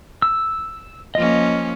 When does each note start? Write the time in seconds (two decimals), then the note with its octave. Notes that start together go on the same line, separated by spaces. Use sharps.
0.22 E6
1.15 F3 A#3 C#4 D#5